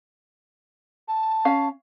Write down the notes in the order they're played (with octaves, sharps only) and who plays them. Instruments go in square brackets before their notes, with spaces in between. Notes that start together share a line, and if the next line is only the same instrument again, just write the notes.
[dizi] A5
[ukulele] C#4 F5